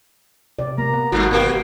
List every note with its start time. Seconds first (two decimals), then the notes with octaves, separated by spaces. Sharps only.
0.59 C3 D5
0.78 A#3 A#5
0.93 B3
1.12 G#1 G2 B3 F#4
1.31 B2 A#3 G4